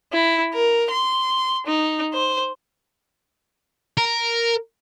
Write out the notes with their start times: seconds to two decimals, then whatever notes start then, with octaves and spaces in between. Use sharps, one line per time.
0.12 E4
0.54 A#4
0.91 C6
1.67 D#4
2.13 C5
3.98 A#4